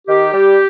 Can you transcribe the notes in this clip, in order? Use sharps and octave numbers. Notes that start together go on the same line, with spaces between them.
D#3 G4
G3